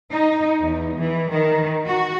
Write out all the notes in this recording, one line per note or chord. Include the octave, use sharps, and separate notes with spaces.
D#4
E2
E3
D#3
F#4